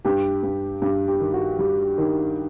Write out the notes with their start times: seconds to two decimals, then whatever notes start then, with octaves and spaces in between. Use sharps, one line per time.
0.05 G2 G4
0.43 G2
0.82 G2 G4
1.08 G4
1.20 D#3
1.34 F#4
1.59 G3
1.98 D#3